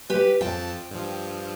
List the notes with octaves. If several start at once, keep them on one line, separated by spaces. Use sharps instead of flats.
G4 B4
F2 F3 G5 A5
G2 F3